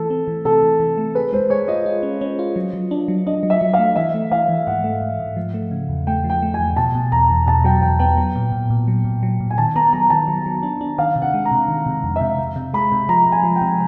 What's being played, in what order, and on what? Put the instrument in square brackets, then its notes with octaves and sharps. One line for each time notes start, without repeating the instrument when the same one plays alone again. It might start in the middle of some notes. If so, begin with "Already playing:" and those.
Already playing: [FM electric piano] E3 A3 [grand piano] A4
[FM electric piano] C4
E3
[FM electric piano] C3 [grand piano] A4
[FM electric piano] E3
E3
A3
[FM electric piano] G#4 [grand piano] B4
[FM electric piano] G#3 [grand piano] C5
[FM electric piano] G#4 [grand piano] C#5
[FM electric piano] F4 [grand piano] D#5
[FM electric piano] F4
C#4
C#4
F4
F#3
F#3
D4
F#3
[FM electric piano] D4 [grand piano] D#5
[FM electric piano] F#3
[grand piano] E5
[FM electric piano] F#3
[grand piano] F5
[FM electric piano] A3
[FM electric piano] E3 [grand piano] E5
[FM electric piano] A3
[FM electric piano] E3 [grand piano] F5
[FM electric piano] E3
[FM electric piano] G#2 [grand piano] F#5
[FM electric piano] A3
G#2
G#2
F3
A3
C#3
E2
[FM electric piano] A3 [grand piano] G5
[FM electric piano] F3
[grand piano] G5
[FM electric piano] A3
[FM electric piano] E2 [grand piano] G#5
[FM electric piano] B2 [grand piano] A5
[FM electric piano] B2
[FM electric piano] E2 [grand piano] A#5
[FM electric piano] E2
[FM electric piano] B2 [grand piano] A5
[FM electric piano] F#3 [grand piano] G5
[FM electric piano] E2 [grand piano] G5
[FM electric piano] B3 [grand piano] G5
[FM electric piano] F#3
A#2
A#2
A#2
F#3
A#2
F#3
A#2
[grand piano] G#5
[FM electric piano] D#3 [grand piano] A5
[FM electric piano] B3 [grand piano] A#5
[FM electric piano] F#3 [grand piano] A#5
[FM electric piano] D#3 [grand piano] A5
[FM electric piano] F#3
F#3
D4
D4
[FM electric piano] D#3 [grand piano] F5
[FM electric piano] C3
[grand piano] F#5
[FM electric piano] G#3
[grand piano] A#5
[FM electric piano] C3
D#3
C3
F2
[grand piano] E5
[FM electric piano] C3
C3
C3
[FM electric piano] G#3 [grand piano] B5
[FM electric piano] C3
[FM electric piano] F3 [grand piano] A#5
[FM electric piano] C3
[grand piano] G#5
[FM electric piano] F3
[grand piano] G5
[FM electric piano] C3